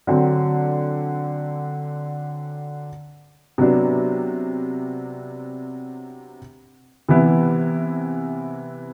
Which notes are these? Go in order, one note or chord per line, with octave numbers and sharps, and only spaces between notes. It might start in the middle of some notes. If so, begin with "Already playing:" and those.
D3 F#3 C4
C3 F#3 B3 D4
C3 E3 B3 E4